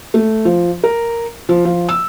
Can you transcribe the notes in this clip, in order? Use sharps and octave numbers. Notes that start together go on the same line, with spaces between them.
A3
F3
A#4
F3
F3
E6